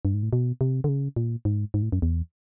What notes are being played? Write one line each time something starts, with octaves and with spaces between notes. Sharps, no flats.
G2
G#2
A2
B2
C3
D3
C#3
A#2
G#2
G#2
A2
F#2
E2